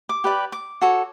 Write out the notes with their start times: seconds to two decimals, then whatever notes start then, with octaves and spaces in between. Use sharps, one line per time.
0.09 D6
0.24 G4 B4 D5
0.52 D6
0.81 F#4 A4 C#5